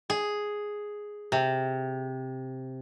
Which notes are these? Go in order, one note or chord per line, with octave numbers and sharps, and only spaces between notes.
G#4
C3